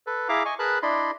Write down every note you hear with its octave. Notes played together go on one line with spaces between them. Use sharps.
A4 B4
E4 G#4 E5 F5 A#5 D6
D#5 G#5 C#6
G#4 A#4 B4 A5 B5 F#6
D4 E4 D5 D#5 B5 C6